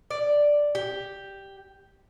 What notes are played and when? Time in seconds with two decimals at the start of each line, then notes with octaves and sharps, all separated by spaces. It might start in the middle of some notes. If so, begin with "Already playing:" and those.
0.11 D5
0.75 G4